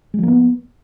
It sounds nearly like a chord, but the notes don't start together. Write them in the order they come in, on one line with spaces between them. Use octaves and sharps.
G#3 F3 A#3 B3